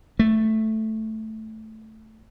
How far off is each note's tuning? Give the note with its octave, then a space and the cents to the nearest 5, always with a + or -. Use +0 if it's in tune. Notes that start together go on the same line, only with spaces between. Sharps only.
A3 +0